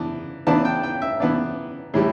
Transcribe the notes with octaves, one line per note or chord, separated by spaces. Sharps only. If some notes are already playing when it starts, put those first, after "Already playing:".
Already playing: E3 B3 D4
E3 B3 D4 A5
G5
G5
E5
E3 B3 D4
A2 E3 G3